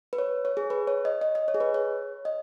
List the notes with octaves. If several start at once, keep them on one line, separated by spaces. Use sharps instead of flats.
B4
C#5
C#5
G#4
B4
C#5
D#5
D#5
D#5
C#5
G#4
B4
C#5
D#5